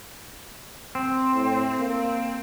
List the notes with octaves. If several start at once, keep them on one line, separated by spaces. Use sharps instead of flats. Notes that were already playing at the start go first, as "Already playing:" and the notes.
C4
A2
A#3